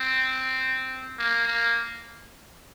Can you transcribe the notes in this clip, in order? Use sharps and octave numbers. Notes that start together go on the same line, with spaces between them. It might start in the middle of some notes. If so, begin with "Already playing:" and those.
Already playing: C4
A#3
A#3